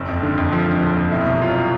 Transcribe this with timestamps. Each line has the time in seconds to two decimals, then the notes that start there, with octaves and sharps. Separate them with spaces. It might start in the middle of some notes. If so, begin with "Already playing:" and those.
Already playing: F#1 C4
0.08 F2
0.23 D3
0.38 F2
0.53 F3
0.68 D3
0.82 F#1
0.96 F2
1.12 B2 E4
1.26 C2
1.42 F#3 F4